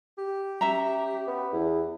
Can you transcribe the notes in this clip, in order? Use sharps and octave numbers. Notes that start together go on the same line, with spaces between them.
G4
C#4 E5 A#5
B3
E2